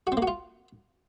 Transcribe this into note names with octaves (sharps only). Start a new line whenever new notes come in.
F#4
C4
A#3
F#4
F4